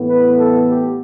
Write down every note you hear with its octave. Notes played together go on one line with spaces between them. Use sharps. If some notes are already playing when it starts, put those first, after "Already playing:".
Already playing: A2 E3 B3
B4
A4
G4